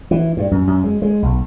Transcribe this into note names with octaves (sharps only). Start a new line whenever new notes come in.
E3
G2
F#2
F#2
G#3
G#3
B1